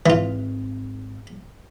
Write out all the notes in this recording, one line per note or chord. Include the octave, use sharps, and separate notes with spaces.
G#1 E3 C4 F4